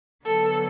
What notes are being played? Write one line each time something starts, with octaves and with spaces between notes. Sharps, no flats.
D3 F#3 B3 A4